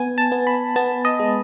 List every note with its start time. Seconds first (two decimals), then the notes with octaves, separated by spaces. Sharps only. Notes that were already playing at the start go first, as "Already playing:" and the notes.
Already playing: B3 G#5
0.18 A5
0.32 B3
0.47 B5
0.76 B3 A5
1.05 D#5
1.20 G#3